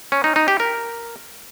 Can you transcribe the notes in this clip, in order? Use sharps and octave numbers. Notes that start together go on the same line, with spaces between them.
C#4
D#4
D#4
G4
A#4